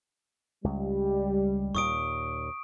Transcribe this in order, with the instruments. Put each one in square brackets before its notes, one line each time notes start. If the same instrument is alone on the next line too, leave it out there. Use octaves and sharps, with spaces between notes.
[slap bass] C#2 [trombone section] G3
[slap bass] D#2 A#2 [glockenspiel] C#6 D#6 D7